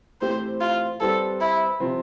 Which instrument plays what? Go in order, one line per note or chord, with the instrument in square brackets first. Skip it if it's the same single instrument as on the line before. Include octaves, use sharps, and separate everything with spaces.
[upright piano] A2 E3 A3 C4 G4 [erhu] C5
[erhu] F4
[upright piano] G3 C4 G4 B4 [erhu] A4
[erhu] E4
[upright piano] C3 F3 C4